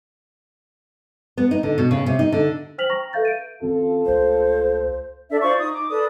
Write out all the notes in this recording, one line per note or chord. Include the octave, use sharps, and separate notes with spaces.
B3
D#4
D3
B2
C#3
C3
D#4
D3
C5 G5 F6 B6 F7 F#7
G5 A#5 C#6 A#6
A4 B4 E5 F5 G6 A6
D7 D#7
D#3 C4 C#4 F4 A4
C#2 A3 C5
D4 A4 D5 E5
F4 C5 D5 C#6
D#4 D#6
D6
A4 B4 D5 D#6